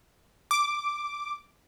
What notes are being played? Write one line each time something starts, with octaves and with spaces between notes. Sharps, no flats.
D6